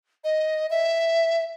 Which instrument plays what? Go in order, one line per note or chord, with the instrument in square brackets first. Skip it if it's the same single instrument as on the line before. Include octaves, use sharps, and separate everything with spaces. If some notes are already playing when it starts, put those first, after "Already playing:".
[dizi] D#5
E5